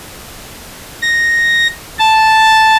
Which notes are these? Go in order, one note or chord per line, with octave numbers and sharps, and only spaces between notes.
A#6
A5